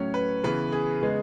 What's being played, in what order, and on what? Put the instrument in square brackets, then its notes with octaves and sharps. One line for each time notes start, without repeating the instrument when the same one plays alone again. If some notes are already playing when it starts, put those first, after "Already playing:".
Already playing: [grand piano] A2 F#3 C#4 C#5
B4
C#3 E3 B3 B4
G#4
C#3 G#3 B3